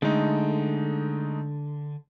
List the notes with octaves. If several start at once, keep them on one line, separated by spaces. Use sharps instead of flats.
D3 G#3 A3 D#4